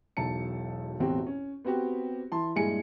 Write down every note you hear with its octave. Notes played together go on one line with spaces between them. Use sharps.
E1 B1 A5 C#7
A1 E2 B2 C4 F#4 G4
C#4
B3 C4 F#4 G4
E3 E4 A5 C6
G2 A#2 G#3 E4 G#5 C#7